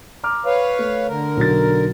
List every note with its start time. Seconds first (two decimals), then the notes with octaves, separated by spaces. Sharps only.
0.24 A#5 D6 F6
0.46 B4 C#5 F5
0.79 A3
1.08 D3 A#4
1.37 B1 F#3 A6